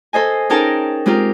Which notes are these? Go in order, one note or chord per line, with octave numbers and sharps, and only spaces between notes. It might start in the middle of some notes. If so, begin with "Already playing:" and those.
A4 C5 D#5 G#5
C#4 D#4 G#4 A#4 G5 A5
G#3 C4 F4 G4 A#4